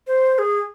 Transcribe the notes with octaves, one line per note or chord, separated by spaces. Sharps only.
C5
C5
G#4